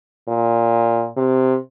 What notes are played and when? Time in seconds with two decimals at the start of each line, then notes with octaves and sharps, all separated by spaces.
0.28 A#2
1.17 C3